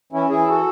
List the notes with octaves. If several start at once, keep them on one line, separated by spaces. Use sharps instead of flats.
E3 C#4 E4
E3 E4 G#4
F#4 A4